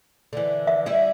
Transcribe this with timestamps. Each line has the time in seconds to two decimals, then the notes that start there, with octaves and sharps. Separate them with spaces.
0.33 D3 E3
0.67 E5
0.86 G3 E4 D#5